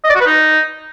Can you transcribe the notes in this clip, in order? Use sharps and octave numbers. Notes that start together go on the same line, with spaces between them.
D#5
D5
F#4
B4
D#4